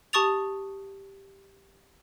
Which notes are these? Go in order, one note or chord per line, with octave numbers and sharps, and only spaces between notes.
G4 A5 C#6 D#6 A6 F7